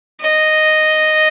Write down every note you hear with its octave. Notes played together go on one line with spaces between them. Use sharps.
D#5